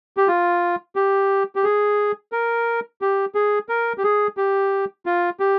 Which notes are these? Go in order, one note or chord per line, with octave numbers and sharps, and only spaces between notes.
G4
F4
G4
G4
G#4
A#4
G4
G#4
A#4
G4
G#4
G4
F4
G4